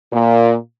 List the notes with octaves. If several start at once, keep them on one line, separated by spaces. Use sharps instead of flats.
A#2